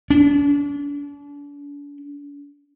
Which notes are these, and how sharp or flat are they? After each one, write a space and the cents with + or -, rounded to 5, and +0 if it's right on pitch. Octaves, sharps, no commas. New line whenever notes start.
D4 -40